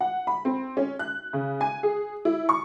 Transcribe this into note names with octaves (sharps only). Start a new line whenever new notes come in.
F#5
B5
C4
C#4
F#6
C#3
G#5
G#4
E4
C#6